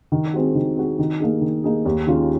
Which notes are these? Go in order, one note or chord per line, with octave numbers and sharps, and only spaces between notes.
D#3
G#3 C4 F#4
D#3
G#3 C4 F#4
D#3
A#3 D#4 G#4
D#3
A#3 D#4 G#4
D#2
D#3 G#3 C#4 F4